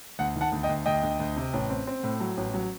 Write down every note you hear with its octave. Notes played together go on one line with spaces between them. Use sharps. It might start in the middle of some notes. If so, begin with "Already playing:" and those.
D2 F#5
D#3
F#5 A5
D2
D#5 G5
D2
D2 D#5 G5
D2
D2
C3
A1
C4
C4
A2
F#3
A1
F#3